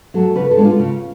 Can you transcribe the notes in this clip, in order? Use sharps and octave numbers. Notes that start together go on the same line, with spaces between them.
F#3 A3 A4
C#3 B4
A4
G#3 B3 D4
F4
C#3